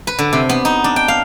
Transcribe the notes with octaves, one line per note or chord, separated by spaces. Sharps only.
B4
D3
C3
B3
D#4
D4
G5
F5